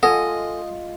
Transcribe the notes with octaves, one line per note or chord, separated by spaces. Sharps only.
G#3 F4 A4 D#5 F#5 G#5